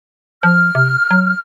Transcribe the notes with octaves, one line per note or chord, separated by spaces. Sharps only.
F3 F6
C3
F#3